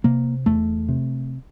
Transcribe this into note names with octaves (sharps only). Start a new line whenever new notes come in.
C3 A#3
E2 A3
C3